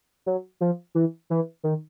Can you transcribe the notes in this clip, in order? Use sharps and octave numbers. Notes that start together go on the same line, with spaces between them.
F#3
F3
E3
E3
D#3